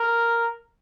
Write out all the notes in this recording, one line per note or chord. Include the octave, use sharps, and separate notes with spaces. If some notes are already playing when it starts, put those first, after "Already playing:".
Already playing: A#4